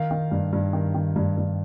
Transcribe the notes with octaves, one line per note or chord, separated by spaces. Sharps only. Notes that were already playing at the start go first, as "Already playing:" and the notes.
Already playing: D#3 F5
D#3
G2
G2
D#3
D#3
G2
G2